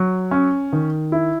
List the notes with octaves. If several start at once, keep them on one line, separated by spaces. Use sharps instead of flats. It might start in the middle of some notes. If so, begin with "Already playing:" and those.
Already playing: F#3
C#4
D#3
E4